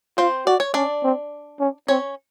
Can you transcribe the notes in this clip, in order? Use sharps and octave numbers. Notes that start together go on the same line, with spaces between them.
C4 F4 C5
F#4 D5
C#5
C#4 D4 D5
C4
C#4
C4 C#4 C#5